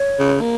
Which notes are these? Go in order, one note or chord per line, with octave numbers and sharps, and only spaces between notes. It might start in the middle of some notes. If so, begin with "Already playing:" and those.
Already playing: C#5
C#3
A#3